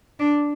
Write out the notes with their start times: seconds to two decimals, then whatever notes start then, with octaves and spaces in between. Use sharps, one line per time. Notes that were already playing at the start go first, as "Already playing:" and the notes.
0.19 D4